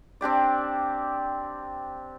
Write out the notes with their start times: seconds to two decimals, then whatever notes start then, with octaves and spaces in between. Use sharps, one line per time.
0.21 C4 D4 G4 D5